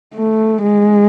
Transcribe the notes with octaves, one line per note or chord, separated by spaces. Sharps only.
A3
G#3